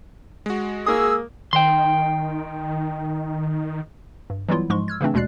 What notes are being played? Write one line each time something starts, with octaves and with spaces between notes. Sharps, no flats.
G#3 F#4
A#3 G#4 D#6 E6
D#3 G5 C6
G2
E3 F#3 G3 B3 E4 F4
G#2 F3 G#3 C6 C#6
E6 F6 G#6
C#3 E3 A3 C4 D4
D#2 B2 G#3 D5 F#6 C7